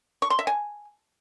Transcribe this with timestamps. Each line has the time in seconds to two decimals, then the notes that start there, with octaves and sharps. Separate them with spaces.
0.22 C#6
0.30 C6
0.39 E5
0.47 G#5